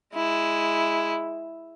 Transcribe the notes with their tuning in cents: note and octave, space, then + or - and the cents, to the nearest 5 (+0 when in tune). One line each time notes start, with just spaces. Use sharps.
G#3 +0 E4 +0